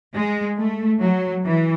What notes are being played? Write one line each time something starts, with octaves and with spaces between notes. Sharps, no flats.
G#3
A3
F#3
E3